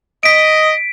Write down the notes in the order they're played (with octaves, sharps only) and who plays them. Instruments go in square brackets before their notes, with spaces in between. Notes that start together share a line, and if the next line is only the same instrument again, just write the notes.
[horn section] D#5 [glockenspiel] B6 D7